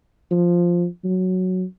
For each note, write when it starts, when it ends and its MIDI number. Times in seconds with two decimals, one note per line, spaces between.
0.31 0.86 53
1.05 1.64 54